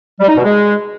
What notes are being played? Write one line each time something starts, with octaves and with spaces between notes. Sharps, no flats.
G3
D#4
B2
G#3